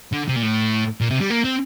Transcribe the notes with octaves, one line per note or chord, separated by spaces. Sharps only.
D3
C3
A#2
A2
A#2
C3
G3
A#3
C4